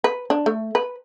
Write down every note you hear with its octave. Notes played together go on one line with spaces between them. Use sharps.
B4
D4
A3
B4